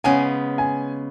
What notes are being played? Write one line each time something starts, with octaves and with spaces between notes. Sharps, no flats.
C#3 G#3 B3 G#5
G#5